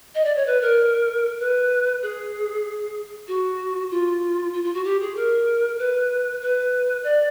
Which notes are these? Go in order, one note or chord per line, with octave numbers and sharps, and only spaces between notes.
D#5
D5
C#5
B4
A#4
B4
G#4
F#4
F4
F4
F4
F#4
G4
G#4
A#4
B4
B4
D5